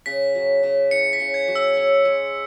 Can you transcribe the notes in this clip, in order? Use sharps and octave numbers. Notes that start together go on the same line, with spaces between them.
C#3 B6
F#3
C#3
E4 C#7
B6
C#3
G#6
F#3
E6
C#5
G#3